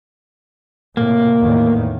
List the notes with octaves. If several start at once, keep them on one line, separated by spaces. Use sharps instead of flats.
A2 C3 A#3
E2 A2 D#3